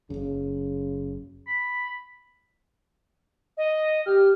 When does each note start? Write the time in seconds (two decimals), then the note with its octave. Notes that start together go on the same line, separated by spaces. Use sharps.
0.10 F#1 F#2 C#3
1.47 B5
3.57 D#5
4.06 G4 F6